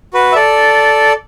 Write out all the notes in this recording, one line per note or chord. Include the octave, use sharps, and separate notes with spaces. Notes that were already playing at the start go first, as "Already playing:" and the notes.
F#4 B4
E5
A4 D5